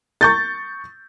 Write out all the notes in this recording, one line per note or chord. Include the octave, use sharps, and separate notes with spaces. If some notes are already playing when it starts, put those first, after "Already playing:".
C#6 G6 A6